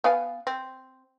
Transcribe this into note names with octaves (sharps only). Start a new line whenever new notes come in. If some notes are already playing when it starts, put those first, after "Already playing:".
B3 F5 G#5
C4